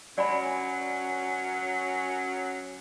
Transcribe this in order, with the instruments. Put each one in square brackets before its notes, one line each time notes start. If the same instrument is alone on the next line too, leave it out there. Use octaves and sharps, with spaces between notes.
[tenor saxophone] F#3 [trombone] C#4 [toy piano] D5 G#5 B5